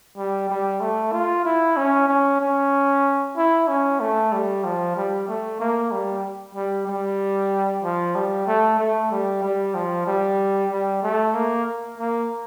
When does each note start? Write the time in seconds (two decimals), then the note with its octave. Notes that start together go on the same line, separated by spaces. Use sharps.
0.17 G3
0.50 G3
0.81 A3
1.13 F4
1.45 E4
1.77 C#4
2.08 C#4
2.41 C#4
3.37 E4
3.68 C#4
4.00 A3
4.32 G3
4.64 F3
4.96 G3
5.28 A3
5.60 A#3
5.92 G3
6.55 G3
6.88 G3
7.84 F3
8.15 G3
8.47 A3
8.79 A3
9.11 G3
9.43 G3
9.75 F3
10.07 G3
10.71 G3
11.03 A3
11.35 A#3
11.98 A#3